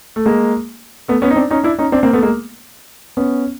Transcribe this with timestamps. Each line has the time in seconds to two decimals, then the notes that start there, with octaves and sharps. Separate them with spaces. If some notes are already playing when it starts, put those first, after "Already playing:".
0.16 A3
0.26 G#3 A#3
1.08 A3 B3
1.22 B3 C#4
1.30 D#4
1.36 C4 D4
1.51 C#4 D#4
1.64 D4 E4
1.79 C#4 D#4
1.92 C4 D4
2.03 A#3 C4
2.13 A3 B3
2.23 G#3 A#3
3.17 B3 C#4